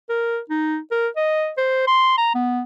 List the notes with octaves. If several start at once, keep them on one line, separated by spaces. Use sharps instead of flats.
A#4
D#4
A#4
D#5
C5
C6
A#5
B3